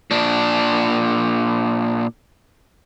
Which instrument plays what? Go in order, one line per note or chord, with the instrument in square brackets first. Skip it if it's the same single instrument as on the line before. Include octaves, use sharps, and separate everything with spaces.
[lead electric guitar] A#2 D4